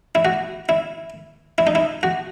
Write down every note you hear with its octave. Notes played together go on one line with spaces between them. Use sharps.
E4
F#4
E4
E4
D#4
E4
F#4